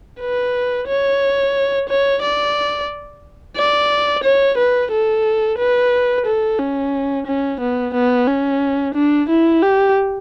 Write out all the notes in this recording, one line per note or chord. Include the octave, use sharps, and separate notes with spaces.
B4
C#5
C#5
D5
D5
C#5
B4
A4
B4
A4
C#4
C#4
B3
B3
C#4
D4
E4
G4